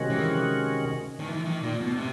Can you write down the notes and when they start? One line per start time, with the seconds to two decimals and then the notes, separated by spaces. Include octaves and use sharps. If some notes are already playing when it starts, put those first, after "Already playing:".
Already playing: C3 D#3 G#3 C#4 F#4
0.10 E3
1.20 D#3
1.28 E3
1.45 D#3
1.63 A#2
1.80 B2
1.98 C3